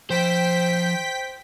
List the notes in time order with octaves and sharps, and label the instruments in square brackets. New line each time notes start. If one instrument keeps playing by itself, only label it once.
[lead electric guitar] F3 B5 [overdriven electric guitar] C5 [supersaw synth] G5 B6